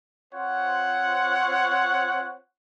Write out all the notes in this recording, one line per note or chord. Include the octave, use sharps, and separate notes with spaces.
C4 F4 C5 C#5 F#5